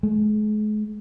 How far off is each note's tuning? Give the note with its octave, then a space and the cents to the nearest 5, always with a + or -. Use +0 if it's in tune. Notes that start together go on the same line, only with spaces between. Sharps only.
G#3 +40